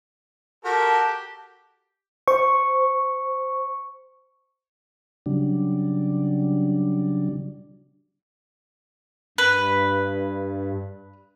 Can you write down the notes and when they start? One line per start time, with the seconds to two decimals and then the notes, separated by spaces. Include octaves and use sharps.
0.65 F#4 G4 A4 A#4 A5
2.28 C5 C#6
5.26 C#3 F#3 G3 D4
9.38 G2 B4